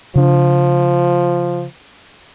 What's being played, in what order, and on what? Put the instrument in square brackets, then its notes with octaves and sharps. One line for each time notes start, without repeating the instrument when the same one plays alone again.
[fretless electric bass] C#3 D4 [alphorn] F3